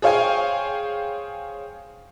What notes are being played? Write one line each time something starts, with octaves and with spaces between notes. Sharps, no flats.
G#4 C5 C#5 F5 G5 G#5